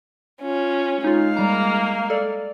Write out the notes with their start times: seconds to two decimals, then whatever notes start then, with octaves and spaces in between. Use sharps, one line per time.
0.42 C#4 F4
1.04 G#3 D#4 F4 F5
1.37 G3 A#3 A#5
2.10 A4 D5